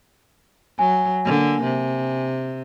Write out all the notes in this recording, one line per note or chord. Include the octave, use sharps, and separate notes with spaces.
F#3 G#5
D3 A#3
C3